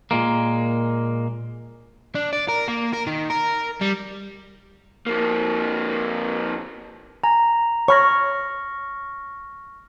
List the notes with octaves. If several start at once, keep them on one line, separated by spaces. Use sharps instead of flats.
A#2 G#3 A#3
D4
D5
A#4
A#3
A#4
D#3
A#4
G3
F2 A#3
G#5 A#5
C#5 B5 C#6 F6 A#6